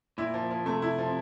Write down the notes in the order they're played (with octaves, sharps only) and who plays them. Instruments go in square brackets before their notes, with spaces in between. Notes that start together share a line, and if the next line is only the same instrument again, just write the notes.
[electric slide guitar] A#2 [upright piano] E4
[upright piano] F3
F3
[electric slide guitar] C3 [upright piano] A3
[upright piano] E4
F3